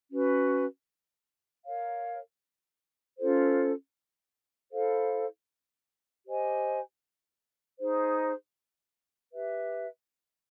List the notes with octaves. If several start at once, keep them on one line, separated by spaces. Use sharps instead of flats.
C#4 F#4 B4
A#4 C#5 F5
C#4 F4 A4 C5
E4 A4 C5 F5
G4 C5 D#5 G#5
D#4 G#4 C5
G4 B4 E5